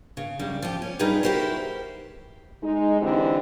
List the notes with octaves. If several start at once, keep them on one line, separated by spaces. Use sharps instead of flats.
C#3
F#2 C#3 G3
F3 G4
C#4
G3 D#4 F4 G4 G#4 B4
E4 F#4 G4 A#4 C5
G#3 D#4
D3 E3 C4 D#4 E4 G4